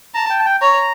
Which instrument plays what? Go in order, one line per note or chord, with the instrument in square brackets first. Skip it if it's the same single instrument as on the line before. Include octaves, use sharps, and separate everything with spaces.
[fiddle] A5 [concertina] A#5
[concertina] G5
A5
G5
[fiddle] C#5 [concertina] A#5